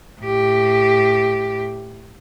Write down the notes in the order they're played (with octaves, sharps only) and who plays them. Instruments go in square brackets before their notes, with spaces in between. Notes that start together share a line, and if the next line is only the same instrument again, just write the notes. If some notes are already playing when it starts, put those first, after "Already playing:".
[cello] A2 G4